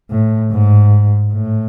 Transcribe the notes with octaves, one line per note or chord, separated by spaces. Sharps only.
A2
G#2
A2